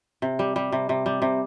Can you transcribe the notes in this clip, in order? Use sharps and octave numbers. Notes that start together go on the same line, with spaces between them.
C3
G3
G3
C3
C3
G3
C3